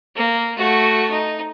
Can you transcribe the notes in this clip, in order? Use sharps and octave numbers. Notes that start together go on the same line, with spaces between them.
A#3
A3 F#4
D#4